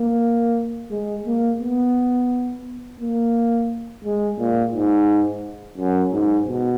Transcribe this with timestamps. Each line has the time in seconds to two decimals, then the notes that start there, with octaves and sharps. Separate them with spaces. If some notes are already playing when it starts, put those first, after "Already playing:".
Already playing: A#3
0.90 G#3
1.26 A#3
1.61 B3
3.00 A#3
4.04 G#3
4.39 A#2
4.74 G#2
5.78 F#2
6.13 G#2
6.48 B2